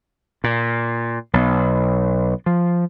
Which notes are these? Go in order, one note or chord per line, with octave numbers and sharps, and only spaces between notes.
A#2
B1 B2
F3